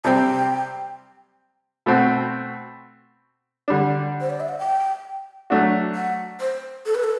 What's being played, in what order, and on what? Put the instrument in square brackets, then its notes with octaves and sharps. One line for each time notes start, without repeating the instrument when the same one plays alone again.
[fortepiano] C3 G3 C4 [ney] G5 A5
[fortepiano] B2 A3 C4 F#4
D3 G3 D4
[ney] C5
D5
E5
F#5
G5
[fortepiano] F#3 A3 D4 F#4
[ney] F#5
C5
A4
B4
A4